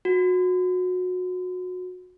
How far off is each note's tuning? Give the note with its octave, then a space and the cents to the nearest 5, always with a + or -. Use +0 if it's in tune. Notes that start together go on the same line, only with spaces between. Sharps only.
F#4 -25